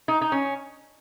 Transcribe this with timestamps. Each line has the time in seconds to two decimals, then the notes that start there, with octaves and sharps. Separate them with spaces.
0.08 D#4
0.21 D#4
0.32 C#4